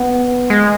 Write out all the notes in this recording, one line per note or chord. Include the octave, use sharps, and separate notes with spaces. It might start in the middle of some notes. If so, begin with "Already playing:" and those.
Already playing: B3
G#3